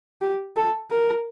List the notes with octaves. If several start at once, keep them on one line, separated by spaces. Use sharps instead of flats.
G4
A4
A#4